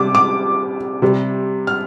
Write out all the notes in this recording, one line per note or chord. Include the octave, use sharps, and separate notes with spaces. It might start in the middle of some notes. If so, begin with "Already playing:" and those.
Already playing: C3 G3 D6
D6
C3 G3
F6